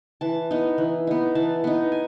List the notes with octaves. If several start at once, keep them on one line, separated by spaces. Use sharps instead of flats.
E3 A5
B3 D#4
E3
B3 D#4
E3 A5
B3 D#4
G#5